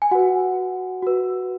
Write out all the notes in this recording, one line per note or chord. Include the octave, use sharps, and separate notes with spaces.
G#5
F#4 B4 F#5
F#4 B4